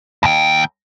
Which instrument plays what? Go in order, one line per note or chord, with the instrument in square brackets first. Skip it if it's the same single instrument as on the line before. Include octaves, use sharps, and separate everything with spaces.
[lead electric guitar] D#2 G5